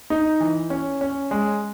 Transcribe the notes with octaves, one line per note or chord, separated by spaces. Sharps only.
D#4
E3
C#4
C#4
G#3